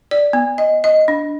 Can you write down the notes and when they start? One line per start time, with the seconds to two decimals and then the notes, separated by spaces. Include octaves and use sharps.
0.11 D5
0.33 B3
0.58 D#5
0.84 D#5
1.08 D4